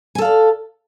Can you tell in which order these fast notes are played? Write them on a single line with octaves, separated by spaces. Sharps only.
G#5 A4 F5 D5